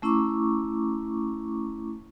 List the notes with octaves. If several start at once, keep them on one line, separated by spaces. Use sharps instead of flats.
A3 C#4 E4 A#5 C#6 D6